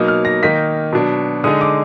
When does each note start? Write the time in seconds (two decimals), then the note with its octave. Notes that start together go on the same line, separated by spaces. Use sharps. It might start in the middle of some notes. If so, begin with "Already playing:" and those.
Already playing: B2 F#3 A#3 D#4
0.08 F6
0.25 A#6
0.43 D#3 A#3 D#4 B6
0.93 B2 F#3 D4
1.44 D3 G#3 D#4 D#6
1.61 D6